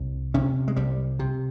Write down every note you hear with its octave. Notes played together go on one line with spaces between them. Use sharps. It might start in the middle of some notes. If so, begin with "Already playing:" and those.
Already playing: C2
C3 C#4
G#3
C2 G3
C3